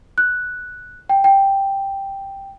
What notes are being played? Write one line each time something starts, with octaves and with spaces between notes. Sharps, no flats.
F#6
G5
G5